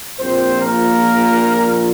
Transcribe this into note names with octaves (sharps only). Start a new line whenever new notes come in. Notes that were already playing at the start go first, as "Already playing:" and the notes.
A#1 A#2 F3 C4 C5
A#3 A#4